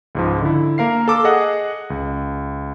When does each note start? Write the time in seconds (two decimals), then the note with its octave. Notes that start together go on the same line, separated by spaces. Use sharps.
0.15 C#2 G#2 F3
0.41 D3 E4
0.78 A#3 A#4 F5 C7
1.08 A4 D6 E6
1.24 G#4 D#5 F#5
1.90 C#2